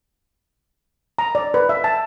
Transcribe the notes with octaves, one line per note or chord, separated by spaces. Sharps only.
A#5
D5
B4
E5
A5